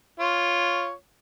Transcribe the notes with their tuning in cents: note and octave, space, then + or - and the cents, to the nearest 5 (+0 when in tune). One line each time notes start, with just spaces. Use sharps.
F4 +0 C#5 +0